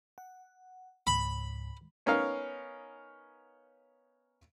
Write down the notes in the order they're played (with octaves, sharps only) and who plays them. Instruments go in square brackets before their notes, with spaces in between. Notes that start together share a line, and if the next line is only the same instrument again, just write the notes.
[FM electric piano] F#5
[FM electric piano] C#2 G#2 [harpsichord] B5
[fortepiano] B3 C#4 D#4 A#4 C#5 F5